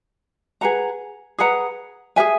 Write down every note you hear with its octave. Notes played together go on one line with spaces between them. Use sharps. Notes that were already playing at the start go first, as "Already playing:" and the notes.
G#4 B4 F#5 A#5
G#4 B4 F#5 A#5
G#4 B4 E5 G#5